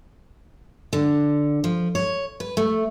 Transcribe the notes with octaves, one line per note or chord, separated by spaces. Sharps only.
D3
F3
C#5
B4
A3